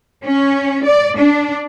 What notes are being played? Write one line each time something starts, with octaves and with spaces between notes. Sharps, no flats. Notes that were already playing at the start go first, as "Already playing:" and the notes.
C#4
D5
D4